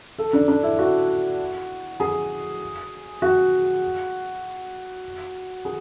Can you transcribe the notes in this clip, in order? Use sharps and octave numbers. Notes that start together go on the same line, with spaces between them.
A4
D4
D4
E4
F#4
G#4
F#4
G#4